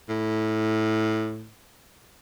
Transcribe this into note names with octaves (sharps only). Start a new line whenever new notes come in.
A2